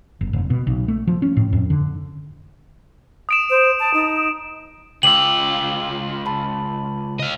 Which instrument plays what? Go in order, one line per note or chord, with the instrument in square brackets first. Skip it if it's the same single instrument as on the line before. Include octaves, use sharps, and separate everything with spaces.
[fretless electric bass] F#1
F1
B2
B1
A3
F3
C#4
A2
F2
D3
[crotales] D#6 D7 E7
[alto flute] C5
A5
D#4
[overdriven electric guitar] C#2 F4 [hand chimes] G5 D6 E6 [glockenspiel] F#7
[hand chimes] A5 B5
[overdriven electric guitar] D#5 F5